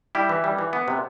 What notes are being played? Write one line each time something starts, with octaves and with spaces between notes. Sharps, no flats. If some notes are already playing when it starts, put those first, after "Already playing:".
G3 E4 G4
E3
G3
E3
B3
C3